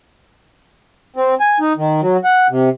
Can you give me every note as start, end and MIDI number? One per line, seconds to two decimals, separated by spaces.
1.16 1.35 60
1.40 1.58 80
1.60 1.73 63
1.77 2.01 51
2.02 2.17 54
2.24 2.47 78
2.50 2.69 48